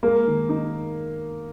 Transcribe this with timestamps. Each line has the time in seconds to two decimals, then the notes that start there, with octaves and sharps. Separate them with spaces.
0.03 G#3 A#3
0.27 D#3
0.49 D#4